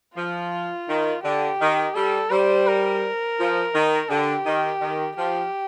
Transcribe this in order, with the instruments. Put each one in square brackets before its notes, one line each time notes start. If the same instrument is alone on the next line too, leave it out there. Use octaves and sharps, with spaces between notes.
[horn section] F3 [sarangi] F4
[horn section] D#3
[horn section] D3 [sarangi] G4
[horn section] D#3
[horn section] G3 [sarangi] A4
[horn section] G3 [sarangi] C5
[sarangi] A#4
[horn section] F3
D#3
[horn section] D3 [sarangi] G4
[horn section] D#3
D#3
[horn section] F3 [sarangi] G4